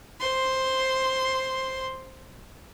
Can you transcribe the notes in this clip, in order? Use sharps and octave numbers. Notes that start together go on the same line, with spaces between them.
C5 C6